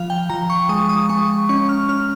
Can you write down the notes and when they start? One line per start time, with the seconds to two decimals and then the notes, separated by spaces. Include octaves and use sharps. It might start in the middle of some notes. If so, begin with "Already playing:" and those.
Already playing: F3 F5
0.10 G5
0.29 F3 A#5
0.50 C#6
0.69 G#3 D#6
0.89 D#6
1.09 G#3 C#6
1.49 C#4 C#6
1.69 F6
1.89 C#4 F6